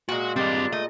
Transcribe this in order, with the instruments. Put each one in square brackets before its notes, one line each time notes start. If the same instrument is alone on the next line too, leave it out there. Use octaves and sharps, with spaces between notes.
[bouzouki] A#2 G#3 [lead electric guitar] F#4
[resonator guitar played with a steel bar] G3 [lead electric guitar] C4 D#5 [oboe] D4
[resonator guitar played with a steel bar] A3 [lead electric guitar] D#5